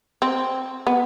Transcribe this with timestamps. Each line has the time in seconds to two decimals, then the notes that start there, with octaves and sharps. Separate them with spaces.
0.22 C4
0.87 B3